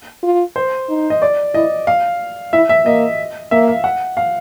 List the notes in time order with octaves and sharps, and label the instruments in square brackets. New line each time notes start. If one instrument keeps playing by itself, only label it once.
[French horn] F4
[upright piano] C5
[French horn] D#4
[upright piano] D#5
D5
[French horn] E4 [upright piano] D#5
[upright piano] F5
[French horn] E4 [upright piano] E5
[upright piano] E5
[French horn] A#3 [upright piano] D#5
[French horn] A#3 [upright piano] E5
[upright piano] F5
F#5
F5